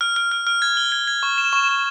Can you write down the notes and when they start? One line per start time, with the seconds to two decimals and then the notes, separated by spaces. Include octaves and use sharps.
0.01 F6
0.16 F6
0.32 F6
0.47 F6
0.62 G#6
0.77 G7
0.92 G#6
1.08 G#6
1.23 C#6
1.38 E7
1.53 C#6
1.68 C#6